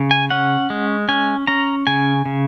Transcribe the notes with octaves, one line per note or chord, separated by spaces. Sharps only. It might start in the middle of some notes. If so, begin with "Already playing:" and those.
Already playing: C#3
G#5
C#4 F#5
G#3
C#4 G#5
C#4 A#5
C#3 G#5
C#3